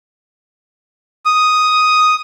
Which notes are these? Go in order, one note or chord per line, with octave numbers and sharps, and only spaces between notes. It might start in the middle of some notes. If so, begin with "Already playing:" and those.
D#6